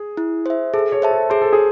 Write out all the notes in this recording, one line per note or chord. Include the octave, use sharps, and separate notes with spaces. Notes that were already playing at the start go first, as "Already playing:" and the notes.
Already playing: G#4
E4
C5 E5
G#4 A4
A4 C#5
C5 E5 A5
A4
G#4 C5
A4
G#4